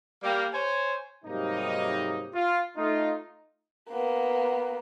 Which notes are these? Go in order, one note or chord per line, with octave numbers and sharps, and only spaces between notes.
G3 A#3
C5 C#5 G#5
G#2 C3 F#3 G3 A#3 D#4
F4
A3 D#4 F4
A#3 B3